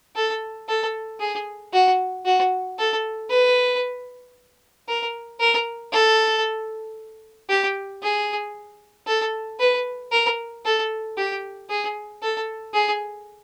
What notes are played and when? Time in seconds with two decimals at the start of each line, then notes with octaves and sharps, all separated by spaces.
0.16 A4
0.69 A4
1.20 G#4
1.73 F#4
2.25 F#4
2.78 A4
3.30 B4
4.88 A#4
5.40 A#4
5.92 A4
7.49 G4
8.03 G#4
9.07 A4
9.60 B4
10.12 A#4
10.65 A4
11.18 G4
11.69 G#4
12.22 A4
12.74 G#4